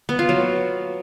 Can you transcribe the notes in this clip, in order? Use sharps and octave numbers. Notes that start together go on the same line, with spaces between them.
B3
F4
F#3